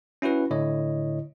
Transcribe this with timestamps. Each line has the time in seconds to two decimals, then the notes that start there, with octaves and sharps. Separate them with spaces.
0.22 C#4 E4 F#4 B4
0.50 A2 D3 E4 C#5 D#5